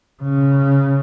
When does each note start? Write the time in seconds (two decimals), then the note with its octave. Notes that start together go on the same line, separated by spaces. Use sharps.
0.23 C#3